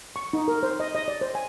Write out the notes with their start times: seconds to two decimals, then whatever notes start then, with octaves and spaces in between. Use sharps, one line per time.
0.16 C#6
0.33 D#4
0.48 A#4
0.63 C5
0.80 D#5
0.95 D#5
1.08 D5
1.21 C5
1.35 G#5